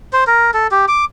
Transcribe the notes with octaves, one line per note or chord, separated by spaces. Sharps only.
C5
A#4
A4
G4
D6